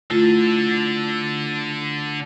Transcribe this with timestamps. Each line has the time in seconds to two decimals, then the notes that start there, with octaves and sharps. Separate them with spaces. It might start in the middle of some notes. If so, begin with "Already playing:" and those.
0.11 D3 A3 E4 F4 A4